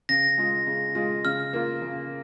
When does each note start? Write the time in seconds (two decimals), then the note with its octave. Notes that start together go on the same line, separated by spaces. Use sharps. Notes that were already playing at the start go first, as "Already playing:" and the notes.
0.09 C#3 A#6
0.38 G#3 F4
0.67 C#3
0.95 G#3 F4
1.25 C#3 F6
1.53 A#3 F4
1.82 C#3